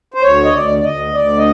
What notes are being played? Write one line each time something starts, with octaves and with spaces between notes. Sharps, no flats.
C5
D2 C#5
D#5
D2 D5
D5
D2 D#5
D2 D5
D#5